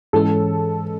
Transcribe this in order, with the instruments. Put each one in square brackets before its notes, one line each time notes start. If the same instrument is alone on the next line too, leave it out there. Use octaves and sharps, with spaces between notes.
[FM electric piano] G#2 E3 G#3 C#4 [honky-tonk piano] A4